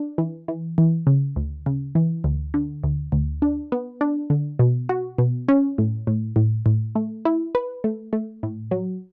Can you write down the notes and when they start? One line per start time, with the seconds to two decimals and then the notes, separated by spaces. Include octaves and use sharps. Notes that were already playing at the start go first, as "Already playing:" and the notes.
Already playing: D4
0.18 E3
0.48 E3
0.78 E3
1.07 C#3
1.36 D2
1.66 C#3
1.95 E3
2.24 D2
2.54 D3
2.83 D2
3.12 D2
3.42 D4
3.72 B3
4.01 D4
4.30 D3
4.59 B2
4.89 F#4
5.18 B2
5.48 C#4
5.78 A2
6.07 A2
6.36 A2
6.66 A2
6.95 A3
7.25 E4
7.55 B4
7.84 A3
8.13 A3
8.43 A2
8.71 F#3